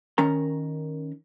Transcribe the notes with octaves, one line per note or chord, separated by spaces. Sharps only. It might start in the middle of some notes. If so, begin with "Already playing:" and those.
D#3 C#4 A#4 A#5